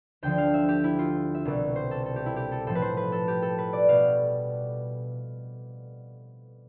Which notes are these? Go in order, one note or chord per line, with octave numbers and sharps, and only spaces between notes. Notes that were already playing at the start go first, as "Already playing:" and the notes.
D2 D3 F3 G5
F5
E5
G4
E4
F4
E5
C2 B2 G3
C5
A4
A4
G4
E4
G4
A4
A2 F3 A4
B4
C5
B4
A4
G4
A4
B4
D5
B2 G3 F5